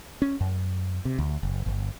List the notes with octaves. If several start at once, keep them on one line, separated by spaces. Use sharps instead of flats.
C#4
F#2
C3
D2
F#1
G1